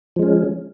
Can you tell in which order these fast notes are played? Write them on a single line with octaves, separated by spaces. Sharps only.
F3 G#3 C#4